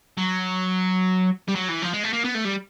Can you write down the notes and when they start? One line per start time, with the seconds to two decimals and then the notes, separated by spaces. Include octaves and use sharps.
0.17 F#3
1.48 G3
1.55 F#3
1.69 E3
1.82 F3
1.93 G#3
2.04 A3
2.13 A#3
2.24 B3
2.35 A3
2.45 G3